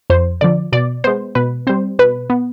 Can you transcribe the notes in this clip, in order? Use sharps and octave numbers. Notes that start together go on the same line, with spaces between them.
F2 C5
D3 F3 D5
B2 D5
G#3 B3 C5
B2 B4
G3 C4 C5
B2 B4
B3